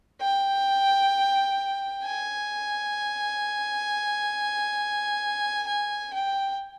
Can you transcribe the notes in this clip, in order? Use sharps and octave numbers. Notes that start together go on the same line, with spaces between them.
G5
G#5
G#5
G5